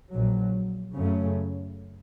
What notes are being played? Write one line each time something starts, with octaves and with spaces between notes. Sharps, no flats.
A#1 A#2 F#3
F#2 C#3 A3 C#4